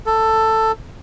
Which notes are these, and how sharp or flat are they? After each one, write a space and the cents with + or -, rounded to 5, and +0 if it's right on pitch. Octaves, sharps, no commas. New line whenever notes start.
A4 +10